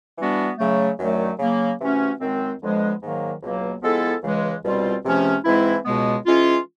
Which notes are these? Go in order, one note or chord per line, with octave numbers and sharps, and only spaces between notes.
E3 G3 B3 D4 F#4
C#3 F#3 A3
F#2 D#3 F#3 A3 D4
C#3 F#3 A#3
C3 E3 A3 C#4 F#4
F#2 D#3 G#3 C4
F2 D3 F3 G#3 B3
G#2 D#3 F#3 A#3
C#2 B2 F#3 A#3
F3 G#3 B3 E4 A4
C#2 C#3 E3 G#3
C2 B2 G3 C4 F4
C#2 C3 F3 A3 C#4
G#2 E3 G#3 C4 E4
C#2 B2 G#3 B3
E3 G#3 C#4 F4